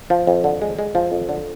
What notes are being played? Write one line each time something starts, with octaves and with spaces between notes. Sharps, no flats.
F3
F2
D3
G#3
G#3
F3
F2
D3